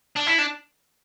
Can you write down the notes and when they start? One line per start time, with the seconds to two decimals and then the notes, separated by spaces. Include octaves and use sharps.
0.16 D4
0.27 E4
0.38 D4